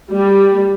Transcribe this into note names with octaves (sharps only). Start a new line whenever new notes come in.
G3